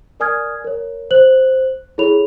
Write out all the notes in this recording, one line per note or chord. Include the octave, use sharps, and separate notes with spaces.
A#4 D5 G#5 D#6 F6 G#6
A#4 C#5
C5 F#6 F#7
E4 G#4 A4 C#5 B5 F7